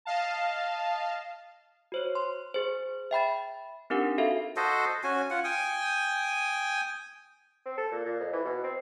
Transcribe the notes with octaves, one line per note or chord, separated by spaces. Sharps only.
D#5 F5 A5
F#4 C5 C#5
C6
G#4 C5
E5 G5 B5 A6
C4 D4 D#4 G4 A#4 F#5
F#4 A4 E5 F5
F#4 A4 C5 D#5
C#4 F#4 G#5
F4 F#5
G5 G#5 D#6
C4
A4
A#2
A#2
F2
E3
B2
C4